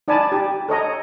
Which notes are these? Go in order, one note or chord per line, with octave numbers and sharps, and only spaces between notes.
D#4 D5 G#5 A5 B5
G4
A4 C#5 D#5 A#5